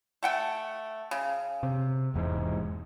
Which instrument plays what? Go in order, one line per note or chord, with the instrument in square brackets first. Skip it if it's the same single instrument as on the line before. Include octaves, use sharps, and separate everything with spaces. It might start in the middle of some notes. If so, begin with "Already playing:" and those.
[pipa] A3 F#5 G5
C#3
[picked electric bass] C3
E1 E2 G#2